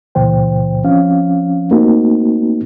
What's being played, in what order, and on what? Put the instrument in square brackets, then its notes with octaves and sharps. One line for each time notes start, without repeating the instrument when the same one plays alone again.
[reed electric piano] C#2 A#2 E3 C5 G5
F3 C4 C#4 F5
A3 A#3 C4 D#4 F#4